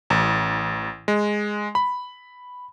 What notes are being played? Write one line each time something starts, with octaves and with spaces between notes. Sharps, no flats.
A1
G#3
B5